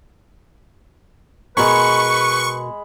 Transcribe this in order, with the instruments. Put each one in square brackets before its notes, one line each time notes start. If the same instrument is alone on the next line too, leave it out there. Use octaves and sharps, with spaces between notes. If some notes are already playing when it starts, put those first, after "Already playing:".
[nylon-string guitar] B2 A#4 G#5 [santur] G#3 B5 [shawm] B4 [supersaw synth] C#6